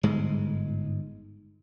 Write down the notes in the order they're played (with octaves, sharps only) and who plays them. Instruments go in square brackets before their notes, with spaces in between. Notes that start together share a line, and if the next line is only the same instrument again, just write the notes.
[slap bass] G1 G#2 G#3